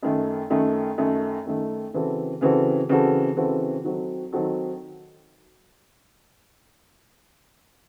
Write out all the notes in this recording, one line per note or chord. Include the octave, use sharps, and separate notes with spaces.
F#2 D#3 A3
F#2 D#3 A3
F#2 D#3 A3
F#2 D#3 A3
C#3 E3 C4 F#4 A4
C#3 E3 C4 F#4 A4
C#3 E3 C4 F#4 A4
C#3 E3 C4 F#4 A4
D#3 F#3 C4 F#4 A4
D#3 F#3 C4 F#4 A4